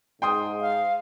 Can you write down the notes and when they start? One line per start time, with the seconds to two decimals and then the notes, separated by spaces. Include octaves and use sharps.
0.22 G#2 G5 C6 D#6
0.61 F5